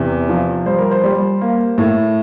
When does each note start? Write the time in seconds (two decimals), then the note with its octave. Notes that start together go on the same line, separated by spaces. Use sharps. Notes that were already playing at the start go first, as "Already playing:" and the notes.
Already playing: E2 C3
0.29 F3
0.66 G3 C5
0.79 A#4
0.91 C5
1.04 G3
1.41 A#3
1.78 A2